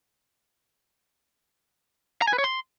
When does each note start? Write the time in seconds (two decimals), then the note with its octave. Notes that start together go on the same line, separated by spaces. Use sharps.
2.22 A#5
2.27 G#5
2.33 B4
2.38 C#5
2.44 C6